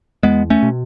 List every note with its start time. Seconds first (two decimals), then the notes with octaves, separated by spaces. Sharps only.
0.23 E2 G#3 B3
0.50 A3 C#4
0.63 B2